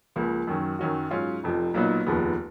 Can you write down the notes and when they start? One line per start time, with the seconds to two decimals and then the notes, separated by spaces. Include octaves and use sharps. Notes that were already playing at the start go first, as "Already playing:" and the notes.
0.16 C#2 C#3 F3 A#3
0.47 F#2 D#3 F#3 C#4
0.79 F#2 D#3 F#3 C#4 F#4
1.11 G#2 F#3 C#4 F4
1.43 F1 F2 F3
1.74 B1 A#2 F#3 B3 D#4
2.06 F1 D#2 C#3 F3 B3